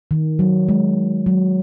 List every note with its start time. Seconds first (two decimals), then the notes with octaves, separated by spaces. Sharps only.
0.11 D#3
0.39 F#3
0.69 G#3
1.26 F#3